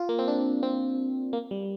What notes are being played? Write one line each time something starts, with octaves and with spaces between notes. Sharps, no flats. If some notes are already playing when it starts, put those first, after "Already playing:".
Already playing: F4
A#3
C4
D4
C4
A#3
G3